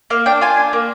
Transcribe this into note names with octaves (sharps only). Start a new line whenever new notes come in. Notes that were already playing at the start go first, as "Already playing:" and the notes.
A#3 F5
D4 G5
F4 G#5
D4
A#3